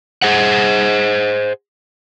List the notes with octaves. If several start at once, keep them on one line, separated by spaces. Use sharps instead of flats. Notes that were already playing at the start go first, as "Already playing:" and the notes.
G#4 C5 F#5